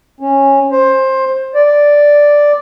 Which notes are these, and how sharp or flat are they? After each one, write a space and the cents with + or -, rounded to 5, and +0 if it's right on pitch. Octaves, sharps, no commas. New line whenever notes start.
C#4 -15
C5 +15
D5 +0